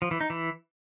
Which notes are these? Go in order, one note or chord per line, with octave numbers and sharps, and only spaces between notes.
F3
E3
D#4
E3